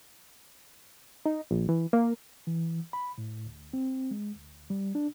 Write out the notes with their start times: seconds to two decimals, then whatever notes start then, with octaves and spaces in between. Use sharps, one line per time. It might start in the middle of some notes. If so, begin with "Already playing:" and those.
1.25 D#4
1.51 A#1
1.69 E3
1.93 A#3
2.47 E3
2.93 B5
3.18 A2
3.46 D2
3.73 C4
4.11 G#3
4.35 D2
4.70 G3
4.95 D4